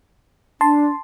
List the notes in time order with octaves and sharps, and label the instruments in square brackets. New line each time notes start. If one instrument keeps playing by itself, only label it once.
[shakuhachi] D4 [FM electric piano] A5 C6